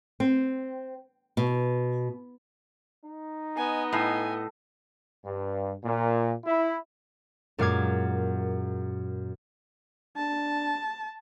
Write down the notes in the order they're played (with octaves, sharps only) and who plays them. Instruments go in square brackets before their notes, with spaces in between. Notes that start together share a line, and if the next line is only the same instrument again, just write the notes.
[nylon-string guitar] C4
B2
[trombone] D#4
[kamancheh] B3 D#5 [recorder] G#5
[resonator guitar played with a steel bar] A2 [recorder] G#5
[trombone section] G2
A#2
E4
[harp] F#2 A#2 G#3 F5 D6 G#6
[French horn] D4 [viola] A5